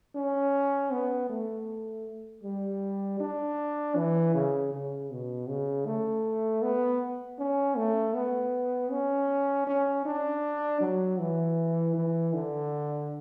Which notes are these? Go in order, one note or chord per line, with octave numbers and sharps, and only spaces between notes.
C#4
B3
A3
G3
D4
E3
C#3
C#3
B2
C#3
A3
B3
C#4
A3
B3
C#4
C#4
D4
F#3
E3
E3
D3